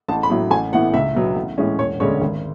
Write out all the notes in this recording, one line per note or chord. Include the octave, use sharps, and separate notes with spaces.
A1 A5
B5
A2 F#3
A1 G#5
A2 E3 B3 F#5
C#2 E5
B2 F#3 B3
A1
A2 E3 G#3 C#4
E1 C#5
D2 D3 G#3 C#4 C#5
G#1